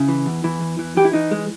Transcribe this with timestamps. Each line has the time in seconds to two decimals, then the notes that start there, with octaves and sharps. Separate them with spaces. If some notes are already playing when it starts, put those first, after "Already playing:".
Already playing: C#3 E4
0.08 E3
0.26 E2
0.44 E3
0.61 E2
0.79 E3
0.97 E3 G4
1.05 E4
1.13 E3 D#4
1.31 G#3